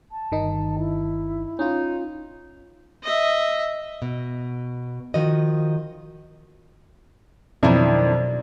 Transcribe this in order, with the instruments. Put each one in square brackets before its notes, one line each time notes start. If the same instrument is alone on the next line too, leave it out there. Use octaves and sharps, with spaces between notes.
[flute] A5
[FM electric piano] G1 D#3 D#4
[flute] E4
[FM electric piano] C#4 F4 [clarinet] D#4
[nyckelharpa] D#5 E5
[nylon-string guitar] B2
D#3 F3 F#4 D#5
[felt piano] F2 [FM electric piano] B2 F#3 [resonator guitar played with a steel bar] D#3 D4 E4 [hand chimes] D5